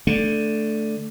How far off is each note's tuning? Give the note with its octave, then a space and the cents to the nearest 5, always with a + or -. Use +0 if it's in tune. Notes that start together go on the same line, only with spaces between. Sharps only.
D3 +0 A3 +0